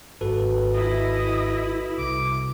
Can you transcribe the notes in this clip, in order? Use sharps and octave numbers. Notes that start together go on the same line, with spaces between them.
G#1 F#4 A4 B4
E4 D#5
C2 D6